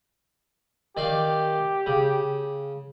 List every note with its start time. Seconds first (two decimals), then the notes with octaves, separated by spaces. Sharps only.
0.97 D#3 G4 D5 F5
1.86 C#3